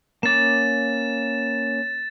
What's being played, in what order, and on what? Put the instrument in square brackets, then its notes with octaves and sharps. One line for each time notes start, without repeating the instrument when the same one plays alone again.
[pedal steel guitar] A#3 C#4 D6 [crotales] A6 E7